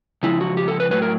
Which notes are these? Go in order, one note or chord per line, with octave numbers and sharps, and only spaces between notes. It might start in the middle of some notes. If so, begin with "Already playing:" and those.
C#3 F3 G#3 E4
F#4
G4
A4
B4
A2 F#3 B4
A#4